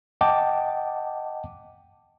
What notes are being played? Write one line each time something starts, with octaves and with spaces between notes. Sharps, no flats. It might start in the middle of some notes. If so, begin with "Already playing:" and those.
D#5 F#5 G5 A5 D6